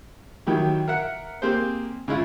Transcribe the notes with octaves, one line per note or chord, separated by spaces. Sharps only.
D#3 F#3 E4 G4
A#4 E5 F#5
A#3 C4 G4 G#4 C5
C#3 G#3 E4 F4